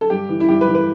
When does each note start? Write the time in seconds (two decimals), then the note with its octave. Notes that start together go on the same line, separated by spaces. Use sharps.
0.01 A4
0.10 G2 G4
0.29 E3
0.40 E4
0.49 G2 G4
0.61 B4
0.68 E3
0.75 B4